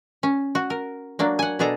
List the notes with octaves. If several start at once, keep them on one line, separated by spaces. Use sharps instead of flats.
C#4
F#4
A#4
F#3 A#3 D4
F#5 G#5
B2 D4 G#4 A4 A#5